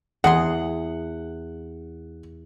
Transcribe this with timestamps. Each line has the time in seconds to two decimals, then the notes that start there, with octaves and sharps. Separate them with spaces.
0.24 E2 G#4 F#5 C6